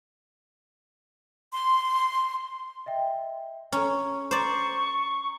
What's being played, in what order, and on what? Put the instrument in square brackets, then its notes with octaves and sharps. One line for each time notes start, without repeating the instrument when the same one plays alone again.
[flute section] C6
[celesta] D#5 E5 G5
[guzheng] C#4 [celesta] A4 A#5
[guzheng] C5 D5 [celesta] A#5 C7 [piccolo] C#6